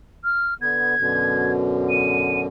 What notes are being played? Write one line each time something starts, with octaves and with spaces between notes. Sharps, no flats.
F6
D3 B3 G#6
F#2 B2 D3
D#7